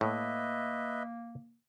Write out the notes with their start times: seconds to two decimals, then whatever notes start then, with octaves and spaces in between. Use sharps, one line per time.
0.01 A2 A#3 B4 D#5 E5